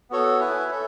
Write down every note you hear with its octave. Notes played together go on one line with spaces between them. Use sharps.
B3 F#4 A4 C#5
E4 B4 E5 G#5
A4 C#5 E5